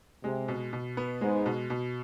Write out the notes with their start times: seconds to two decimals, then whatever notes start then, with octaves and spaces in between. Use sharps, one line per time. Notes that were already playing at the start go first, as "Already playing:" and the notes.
0.24 C3 G#3
0.48 B2
0.73 B2
0.97 B3
1.21 G#2 G#3
1.46 B2
1.70 B2